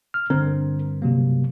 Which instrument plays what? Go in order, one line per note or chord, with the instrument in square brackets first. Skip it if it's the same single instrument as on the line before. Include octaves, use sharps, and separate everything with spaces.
[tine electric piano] F6
[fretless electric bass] G2 C4 [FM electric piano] D3 [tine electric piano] A#4
[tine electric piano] C3 F#3 A#3